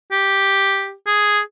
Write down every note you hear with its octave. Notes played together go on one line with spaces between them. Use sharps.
G4
G#4